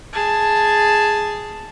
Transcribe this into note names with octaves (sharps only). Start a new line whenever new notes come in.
G#4 A5